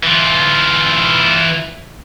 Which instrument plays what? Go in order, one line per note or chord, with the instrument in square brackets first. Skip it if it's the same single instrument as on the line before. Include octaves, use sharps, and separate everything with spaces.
[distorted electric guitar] E3 F4